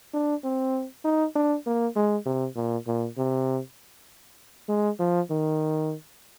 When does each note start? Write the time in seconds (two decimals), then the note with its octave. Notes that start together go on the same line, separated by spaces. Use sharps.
0.14 D4
0.44 C4
1.04 D#4
1.36 D4
1.66 A#3
1.96 G#3
2.26 C3
2.56 A#2
2.87 A#2
3.18 C3
4.69 G#3
5.00 F3
5.30 D#3